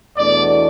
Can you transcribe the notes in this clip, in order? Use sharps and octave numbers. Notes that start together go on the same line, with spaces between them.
E2 B2 A3 D4 D5